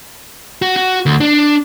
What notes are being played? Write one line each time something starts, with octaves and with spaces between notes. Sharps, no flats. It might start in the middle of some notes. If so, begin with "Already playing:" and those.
F#4
F#4
D2
D4